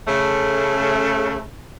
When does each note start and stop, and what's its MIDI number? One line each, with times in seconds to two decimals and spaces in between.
0.08 1.43 49
0.08 1.43 57